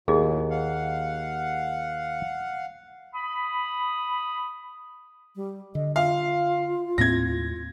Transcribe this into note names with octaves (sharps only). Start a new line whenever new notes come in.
D#2 A2 F#3 G#4 D#5
F5 F#5
B5 D#6
G3
D3 D#5
F4 F5
D#2 A2 C4 G#6 A#6